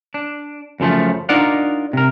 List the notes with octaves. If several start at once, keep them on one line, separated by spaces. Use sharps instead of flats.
D4
F#2 C#3 F3 A3
D4 D#4 F4 A#4 D5 F#5
C3 A#4